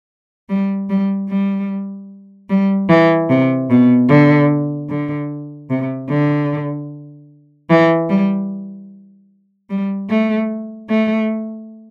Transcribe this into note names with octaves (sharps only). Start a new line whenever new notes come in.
G3
G3
G3
G3
E3
C3
B2
D3
D3
C3
D3
E3
G3
G3
A3
A3